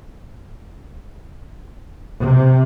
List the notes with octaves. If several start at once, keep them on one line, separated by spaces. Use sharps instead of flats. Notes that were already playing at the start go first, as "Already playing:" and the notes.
C3